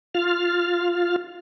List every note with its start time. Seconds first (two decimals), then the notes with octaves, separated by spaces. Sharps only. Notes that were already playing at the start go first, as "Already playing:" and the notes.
0.14 F4 F6